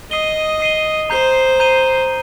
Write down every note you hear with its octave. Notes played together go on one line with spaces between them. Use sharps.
D#5 D#6 C7 D#7 G7
D#6 C7 D#7 G7
C5 A#5 G6 C7 D#7 G7
A#5 G6 C7 D#7 G7